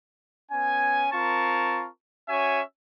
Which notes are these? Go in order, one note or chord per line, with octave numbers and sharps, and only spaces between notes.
B3 C#4 G#5
C4 F4 A#4 A5 C#6
C#4 F#4 C#5 E5 G#5